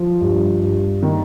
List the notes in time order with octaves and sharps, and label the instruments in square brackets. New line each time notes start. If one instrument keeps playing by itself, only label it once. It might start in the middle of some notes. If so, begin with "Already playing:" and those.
Already playing: [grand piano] F3
G2
G2
[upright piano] D#3 [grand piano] A#3